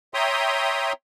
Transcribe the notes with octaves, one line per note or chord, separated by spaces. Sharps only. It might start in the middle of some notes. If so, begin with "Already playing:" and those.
C#5 E5 G5 A#5 C6 D#6